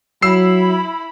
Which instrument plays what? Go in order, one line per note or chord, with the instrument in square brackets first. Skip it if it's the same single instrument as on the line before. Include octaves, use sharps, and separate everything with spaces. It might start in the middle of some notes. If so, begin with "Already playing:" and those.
[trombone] F#3 [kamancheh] E4 B5 [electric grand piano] E6 C7